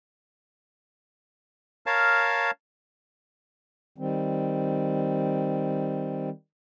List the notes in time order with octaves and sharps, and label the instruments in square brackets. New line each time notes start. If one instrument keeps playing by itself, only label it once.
[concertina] A#4 C#5 F5 A5
[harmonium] D#3 G3 C4